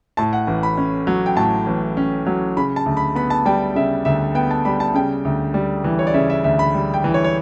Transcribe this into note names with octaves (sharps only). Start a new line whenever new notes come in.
A2 A5
F#5
A1
B5
C#4
F#3
G5
A2 A5
A1
C#4
F#3
C#3 B5
A5
D2
B5
B3 B5
A5
G3 G5
C#3 E5
D2 E5
B3 G5
A5
G3 B5
A5
C#3 G5
D2
G3
E3
C#5
D5
C#3 E5
E5
D2 E5
B5
G3
G5
E3
C#5
C#5